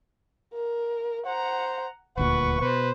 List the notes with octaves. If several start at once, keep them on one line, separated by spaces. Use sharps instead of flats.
A#4
C5 F#5 A#5
D#1 D2 A#2 B4 F#5 C#6
B2 B4 C5